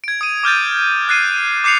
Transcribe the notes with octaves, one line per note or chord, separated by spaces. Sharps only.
G#6 D7
D#6 D#7
D6 F6 G6 A6
D#6 F#6 A6 C7 D#7
D#7
D6 G6 C7 C#7 F7